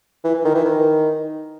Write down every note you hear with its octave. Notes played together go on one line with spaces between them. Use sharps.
E3
E3
D#3
E3
D#3